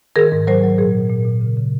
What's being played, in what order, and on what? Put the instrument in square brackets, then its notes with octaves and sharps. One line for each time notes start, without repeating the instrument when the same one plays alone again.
[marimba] D#3 G#4 A#4
G#2
F#3 A#4 C5
F#3
A#2 G#4 A#4
A#2
A#2
A#2
C#3
C#3